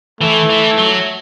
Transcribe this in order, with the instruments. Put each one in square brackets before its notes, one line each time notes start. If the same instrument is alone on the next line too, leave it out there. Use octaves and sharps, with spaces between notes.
[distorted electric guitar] E3 [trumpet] A3
[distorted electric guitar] E3
F#3